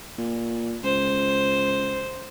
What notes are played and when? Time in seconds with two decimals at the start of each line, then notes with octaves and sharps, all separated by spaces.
0.18 A#2
0.83 C#2 C5